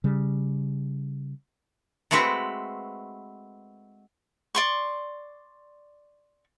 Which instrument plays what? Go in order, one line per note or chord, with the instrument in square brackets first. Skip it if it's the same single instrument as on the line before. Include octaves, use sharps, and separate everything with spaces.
[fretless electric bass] C#3 G3
[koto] G#3 A3 C4 F#4 B4
[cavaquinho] D5 C6 C#6